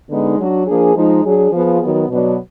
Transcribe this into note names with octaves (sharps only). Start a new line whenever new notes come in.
D3 G#3 B3 D#4
F#3 D4 F#4
F3 A#3 D4 G#4
F3 G#3 D#4
F#3 D4 G#4
F3 B3 F4 G#4
D#3 F#3 B3
B2 F#3 B3 D4 F#4